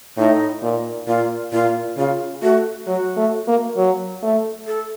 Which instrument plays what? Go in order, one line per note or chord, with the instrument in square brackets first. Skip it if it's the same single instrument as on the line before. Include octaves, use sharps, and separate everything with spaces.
[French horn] A2 [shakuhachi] D#4
[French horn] A#2
[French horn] A#2 [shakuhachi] F4
[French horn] A#2 [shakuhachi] F4
[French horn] C#3 [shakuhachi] F4
[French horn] A3 [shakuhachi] F#4
[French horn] F#3 [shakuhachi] F#4
[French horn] A3
A#3
F#3
A3
[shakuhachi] A4